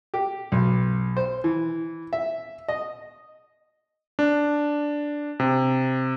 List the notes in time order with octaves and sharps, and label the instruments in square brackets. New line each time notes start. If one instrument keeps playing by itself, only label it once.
[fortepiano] G4
B1
C5
E3
E5
D#5
[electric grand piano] D4
C3